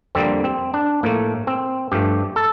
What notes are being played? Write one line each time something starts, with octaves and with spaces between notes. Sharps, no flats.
F2 D3 G3 A#3 C4
C4
D4
A2 F3 A3 A#3
C4
G2 F3 A3 G4
A4